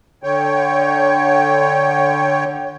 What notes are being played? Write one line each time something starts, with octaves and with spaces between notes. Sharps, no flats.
D3 C#5 G5